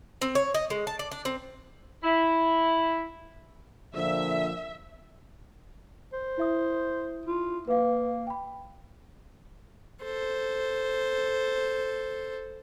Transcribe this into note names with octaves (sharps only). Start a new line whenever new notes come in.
C4
C#5
D#5
G#3
A5
D5
D4
C4
E4
A#2 D3 F3 E5
C5
E4 E5 D#6
F4
A#3 B4 F5
G5 B5
A4 C5